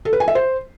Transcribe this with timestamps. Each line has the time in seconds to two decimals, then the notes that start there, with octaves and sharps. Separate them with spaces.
0.05 A4
0.13 B4
0.20 G#5
0.28 E5
0.35 C5